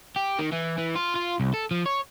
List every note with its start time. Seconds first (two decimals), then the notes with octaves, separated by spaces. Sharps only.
0.16 G4
0.39 D#3
0.52 E3
0.78 E3
0.96 F4
1.16 F4
1.40 C2
1.54 A4
1.71 F3
1.86 C#5